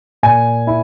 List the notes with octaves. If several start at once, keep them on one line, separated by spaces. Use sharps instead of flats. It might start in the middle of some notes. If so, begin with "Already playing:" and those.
A#2 G#5
E4